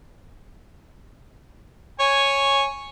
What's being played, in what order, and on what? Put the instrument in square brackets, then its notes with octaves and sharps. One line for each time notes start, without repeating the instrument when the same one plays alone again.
[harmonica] C#5 G#5